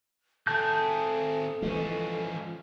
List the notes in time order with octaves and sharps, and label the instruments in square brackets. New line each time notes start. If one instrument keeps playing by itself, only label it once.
[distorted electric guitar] C4 G#4 [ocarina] A4 [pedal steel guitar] A5 G6
[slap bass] E3 G#3 [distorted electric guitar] F3 C#4